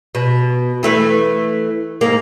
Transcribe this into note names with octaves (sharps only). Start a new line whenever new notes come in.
B2
E3 A3 B4
G#2 A#3